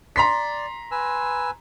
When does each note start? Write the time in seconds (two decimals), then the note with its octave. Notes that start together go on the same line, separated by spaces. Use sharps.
0.16 D5 A#5 C6 B6
0.91 B4 G#5 E6